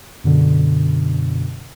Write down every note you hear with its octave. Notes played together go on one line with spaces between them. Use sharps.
F#2 B2 D3